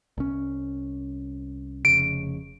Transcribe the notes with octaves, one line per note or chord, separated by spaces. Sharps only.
C2 C#4
F1 C#3 D7